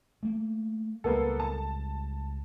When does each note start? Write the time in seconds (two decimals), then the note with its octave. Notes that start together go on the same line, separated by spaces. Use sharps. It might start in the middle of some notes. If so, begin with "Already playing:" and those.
0.23 A3 A#3
1.04 C#2 F#3 G3 A#3 B3 A4
1.40 A5